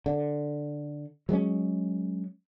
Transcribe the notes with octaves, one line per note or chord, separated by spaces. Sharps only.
D3
F#3 G#3 B3 C#4